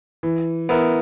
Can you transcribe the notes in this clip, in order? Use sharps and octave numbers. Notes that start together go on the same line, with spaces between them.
E3
B3 E4 A#4